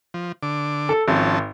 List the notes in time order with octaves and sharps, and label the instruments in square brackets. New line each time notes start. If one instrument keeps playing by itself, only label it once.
[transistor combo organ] F3
D3 D6
[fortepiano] A4
[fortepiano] G#1 [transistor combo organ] F3 C#4 A5